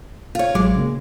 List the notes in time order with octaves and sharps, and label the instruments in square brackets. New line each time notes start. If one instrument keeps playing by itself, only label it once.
[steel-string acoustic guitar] F4 C#5
[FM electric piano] A1 F#3 D6 [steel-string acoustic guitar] G#3
[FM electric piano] C#3 A#3